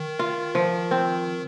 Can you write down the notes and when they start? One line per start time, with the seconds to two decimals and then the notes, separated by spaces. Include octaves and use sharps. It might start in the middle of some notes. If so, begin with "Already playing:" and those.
Already playing: D#3
0.19 F4
0.55 F3
0.91 C4